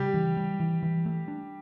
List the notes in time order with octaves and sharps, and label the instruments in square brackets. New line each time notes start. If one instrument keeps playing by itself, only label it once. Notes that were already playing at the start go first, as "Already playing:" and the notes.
Already playing: [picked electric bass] C#3 [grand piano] G3 G4
[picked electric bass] E3
G3
E3
E3
A3
D4